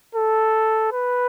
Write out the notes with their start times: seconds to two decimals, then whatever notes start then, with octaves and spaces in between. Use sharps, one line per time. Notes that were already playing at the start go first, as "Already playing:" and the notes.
0.15 A4
0.92 B4